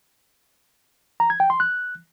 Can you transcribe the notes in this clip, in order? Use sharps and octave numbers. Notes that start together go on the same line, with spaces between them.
A#5
G#6
G5
C6
F#6